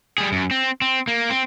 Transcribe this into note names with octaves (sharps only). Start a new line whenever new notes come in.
G3 G#4
F#2
C4
C4
A#3
C4